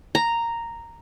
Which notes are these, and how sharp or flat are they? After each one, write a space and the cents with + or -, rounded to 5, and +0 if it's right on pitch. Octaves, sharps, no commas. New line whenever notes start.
A#5 -5